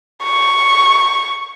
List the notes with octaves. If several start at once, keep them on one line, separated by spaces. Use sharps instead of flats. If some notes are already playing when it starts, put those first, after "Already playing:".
C#6